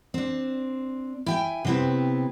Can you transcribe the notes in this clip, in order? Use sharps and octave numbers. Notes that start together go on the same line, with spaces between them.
C4 D4
E4 G5 G#5
C3 B3 C4 E4 B4